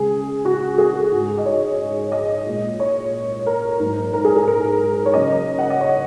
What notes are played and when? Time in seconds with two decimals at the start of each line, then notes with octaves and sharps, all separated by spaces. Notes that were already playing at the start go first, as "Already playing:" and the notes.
Already playing: C#3 G#3 G#4
0.45 F#4
0.78 G#4
1.12 G#2 G#3
1.38 D#5
1.45 C#5
2.12 D#5
2.46 A#2 G#3
2.79 C#5
3.46 A#4
3.79 G#2 F#3 A#3
4.13 A#4
4.25 G#4
4.36 G#4
4.48 A#4
5.05 C#5
5.13 C#3 F#3 A#3 D#5
5.58 F#5
5.70 D#5
5.80 C#5